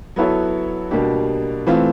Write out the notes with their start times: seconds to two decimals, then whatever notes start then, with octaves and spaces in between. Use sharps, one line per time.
0.16 F#3 B3 E4 A4 C#5
0.91 B2 G3 A#3 D4 G4
1.67 E3 A3 C4 F4